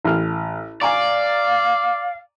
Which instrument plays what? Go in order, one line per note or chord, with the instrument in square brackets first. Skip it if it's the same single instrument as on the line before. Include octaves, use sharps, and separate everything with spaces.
[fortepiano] A1 F6
[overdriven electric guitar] D5 [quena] F5 [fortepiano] G#5 A#5 C#6